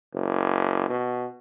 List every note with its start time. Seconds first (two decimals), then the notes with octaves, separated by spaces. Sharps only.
0.13 F#1
0.89 B2